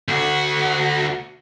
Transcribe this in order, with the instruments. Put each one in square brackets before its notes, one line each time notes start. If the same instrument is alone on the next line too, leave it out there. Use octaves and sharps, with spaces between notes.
[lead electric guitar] D2 F#4